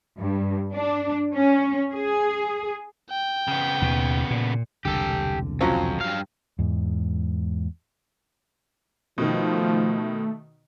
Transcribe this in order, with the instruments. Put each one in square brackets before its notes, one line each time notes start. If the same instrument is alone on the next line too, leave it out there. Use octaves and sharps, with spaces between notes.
[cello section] G2
D4
C#4
G#4
[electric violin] G5
[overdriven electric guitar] C#3 B3
[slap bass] D#2 B2
A#2
[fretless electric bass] E1 C2 D3 [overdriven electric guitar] G4 A4
[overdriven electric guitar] F2 [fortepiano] F3 F#3 C#4
[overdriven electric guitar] G2 F5
[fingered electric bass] E2 G#2
[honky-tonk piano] B2 D#3 [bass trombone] F3 [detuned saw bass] A3